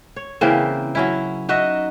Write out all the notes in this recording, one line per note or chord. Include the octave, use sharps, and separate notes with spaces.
C#5
C#3 E3 A#3 C4
F#3 C#4 E4
D#4 F#4 D#5 E5